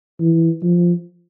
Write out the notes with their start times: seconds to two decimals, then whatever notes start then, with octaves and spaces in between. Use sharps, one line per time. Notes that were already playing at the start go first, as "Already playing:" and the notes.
0.20 E3
0.63 F3